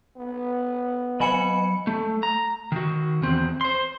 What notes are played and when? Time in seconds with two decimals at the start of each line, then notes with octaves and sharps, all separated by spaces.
0.17 B3
1.20 F#3 D#5 G#5 B5 C#7
1.87 A3
2.23 A#5
2.72 D#3 F#4
3.23 E2 C4
3.61 C5 C6